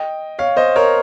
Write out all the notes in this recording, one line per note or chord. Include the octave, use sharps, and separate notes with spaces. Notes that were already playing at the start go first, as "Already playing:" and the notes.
Already playing: D#5 G5
C#5 F5
C5 D#5
A#4 C#5